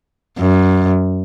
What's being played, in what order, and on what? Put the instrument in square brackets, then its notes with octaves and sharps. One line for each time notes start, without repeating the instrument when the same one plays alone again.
[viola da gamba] F#2